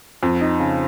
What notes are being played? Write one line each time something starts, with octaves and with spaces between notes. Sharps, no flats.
F2
D#4
C#3